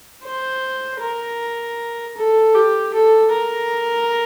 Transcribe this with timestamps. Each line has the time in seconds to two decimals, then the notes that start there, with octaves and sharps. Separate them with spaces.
0.25 C5
1.01 A#4
2.17 A4
2.55 G4
2.94 A4
3.32 A#4